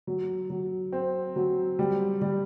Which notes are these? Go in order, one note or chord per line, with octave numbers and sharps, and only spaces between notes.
F#3
F#3
C4
F#3
G3
G3